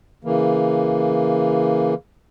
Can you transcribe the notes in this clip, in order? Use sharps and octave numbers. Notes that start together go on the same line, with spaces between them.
C#3 E3 A#3